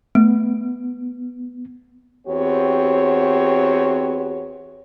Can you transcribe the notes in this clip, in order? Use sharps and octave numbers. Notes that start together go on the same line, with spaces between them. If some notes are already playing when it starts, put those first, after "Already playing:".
A3 B3
E2 C4 F#4 G4 C#5